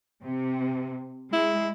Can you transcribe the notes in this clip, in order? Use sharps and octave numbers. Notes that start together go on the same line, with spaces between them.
C3
G#3 E4